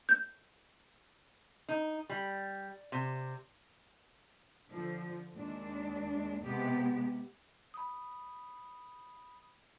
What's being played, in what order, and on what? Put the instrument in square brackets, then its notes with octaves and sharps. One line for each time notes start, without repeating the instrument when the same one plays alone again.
[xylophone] G6
[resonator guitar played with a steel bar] D#4
G3
C3
[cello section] D3 F3
D#2 G#3 D4
C3 G#3 B3 G4
[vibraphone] B5 D#6